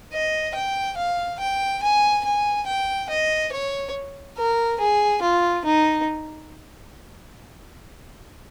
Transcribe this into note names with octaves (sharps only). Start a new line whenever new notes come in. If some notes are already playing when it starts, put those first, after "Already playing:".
D#5
G5
F5
G5
G#5
G#5
G5
D#5
C#5
A#4
G#4
F4
D#4